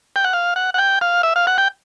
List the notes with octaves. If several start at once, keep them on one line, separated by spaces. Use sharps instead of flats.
G5
F#5
F5
F#5
F#5
G5
F5
E5
F5
F#5
G5